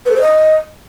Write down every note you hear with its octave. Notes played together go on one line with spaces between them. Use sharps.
B4
A4
C5
D#5